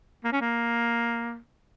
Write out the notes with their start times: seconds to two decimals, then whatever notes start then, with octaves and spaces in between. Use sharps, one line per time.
0.24 A#3
0.32 C#4
0.41 A#3